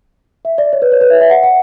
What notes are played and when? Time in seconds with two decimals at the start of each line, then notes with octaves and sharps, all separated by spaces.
0.45 E5
0.58 D5
0.73 C#5
0.82 B4
0.92 C#5
1.01 B4
1.10 E5
1.21 E5
1.30 F#5
1.43 F#5